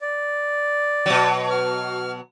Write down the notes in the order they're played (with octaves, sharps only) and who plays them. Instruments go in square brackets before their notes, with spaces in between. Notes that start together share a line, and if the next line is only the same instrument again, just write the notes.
[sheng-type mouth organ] D5
[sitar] B2 F#3
[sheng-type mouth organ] F6